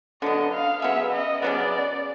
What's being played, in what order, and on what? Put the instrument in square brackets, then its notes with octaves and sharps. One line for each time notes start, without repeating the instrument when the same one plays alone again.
[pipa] D3 F#3 B3 [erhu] D#5
[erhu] F5
[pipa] C#3 F#3 B3 [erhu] E5
[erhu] D#5
[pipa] C#3 F#3 B3 [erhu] D5